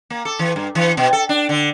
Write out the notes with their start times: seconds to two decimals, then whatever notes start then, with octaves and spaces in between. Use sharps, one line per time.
0.10 A#3
0.25 A4
0.39 E3
0.56 G2
0.75 E3
0.97 B2
1.13 A4
1.29 D4
1.49 D3